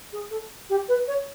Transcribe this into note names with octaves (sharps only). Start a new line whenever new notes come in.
G#4
A4
G4
B4
C#5